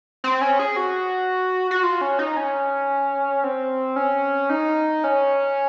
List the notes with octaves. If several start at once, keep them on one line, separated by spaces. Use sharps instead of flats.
C4
C#4
G#4
F#4
F#4
F4
C#4
D#4
C#4
C4
C#4
D#4
C#4